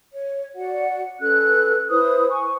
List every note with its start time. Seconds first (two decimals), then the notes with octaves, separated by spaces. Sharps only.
0.12 C#5
0.56 F#4 D5 F#5
1.21 C#4 A4 B4 F#6
1.89 E4 B4 C5 D#6
2.30 G#5 C#6